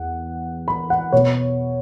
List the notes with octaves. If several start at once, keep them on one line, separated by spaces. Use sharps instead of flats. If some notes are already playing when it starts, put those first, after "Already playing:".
Already playing: E2 E3 F#5
B5
F#5
B2 B3 C#5